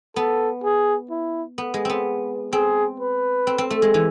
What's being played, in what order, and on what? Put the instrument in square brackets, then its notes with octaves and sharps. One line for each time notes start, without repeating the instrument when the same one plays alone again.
[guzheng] B3 [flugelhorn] A4
[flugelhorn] G#4
E4
[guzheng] B3
G#3
B3 C4
[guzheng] C4 [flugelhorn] G#4
[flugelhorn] B4
[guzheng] C4
C4
A3
G#3
E3